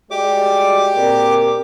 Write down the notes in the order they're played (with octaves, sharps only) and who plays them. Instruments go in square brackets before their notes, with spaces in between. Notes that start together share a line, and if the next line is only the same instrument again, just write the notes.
[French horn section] G#3 F#4 D5 [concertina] G4 D6
[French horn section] A#2 C4 A#4